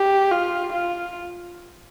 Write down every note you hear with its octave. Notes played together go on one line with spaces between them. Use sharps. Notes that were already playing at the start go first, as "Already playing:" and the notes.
Already playing: G4
F4
F4